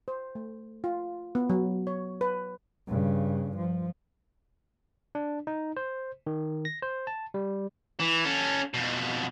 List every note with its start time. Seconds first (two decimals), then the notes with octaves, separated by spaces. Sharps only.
0.08 C5
0.35 A3
0.84 F4
1.35 B3
1.50 F#3
1.87 C#5
2.21 B4
2.88 G2 C#3
3.57 F3
5.15 D4
5.47 D#4
5.77 C5
6.27 D#3
6.65 A#6
6.82 C5
7.07 A5
7.34 G3
8.00 E3
8.25 C#4 A4
8.74 F2 B2